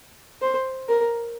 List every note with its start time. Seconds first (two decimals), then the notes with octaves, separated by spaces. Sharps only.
0.42 C5
0.89 A#4